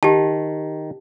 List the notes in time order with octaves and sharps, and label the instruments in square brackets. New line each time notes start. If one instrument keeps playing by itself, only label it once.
[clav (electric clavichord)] D#3 [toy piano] G4 A5